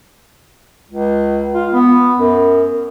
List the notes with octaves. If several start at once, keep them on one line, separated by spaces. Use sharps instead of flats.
C#2
F4
B3
F#2